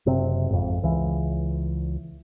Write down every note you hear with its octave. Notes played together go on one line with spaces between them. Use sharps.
F#1 C3 C4
G#1 F2
C#2 E3